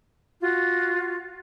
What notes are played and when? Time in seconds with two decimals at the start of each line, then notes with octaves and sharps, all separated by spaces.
0.41 F4 F#4